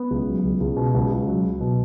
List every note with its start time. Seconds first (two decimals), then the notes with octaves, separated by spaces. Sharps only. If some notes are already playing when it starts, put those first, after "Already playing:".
Already playing: B3
0.10 C#2
0.27 F#3
0.43 C#2
0.60 C#2
0.77 B2
0.94 C#2
1.10 C#2
1.27 F#3
1.44 F#3
1.61 B2